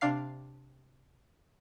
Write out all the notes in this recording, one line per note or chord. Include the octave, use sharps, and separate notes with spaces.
C3 D4 F5 C7